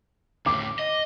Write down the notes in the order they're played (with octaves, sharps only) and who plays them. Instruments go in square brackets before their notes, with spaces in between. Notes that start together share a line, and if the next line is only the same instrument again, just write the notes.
[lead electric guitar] D2 A2 [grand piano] D6
[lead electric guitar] D#5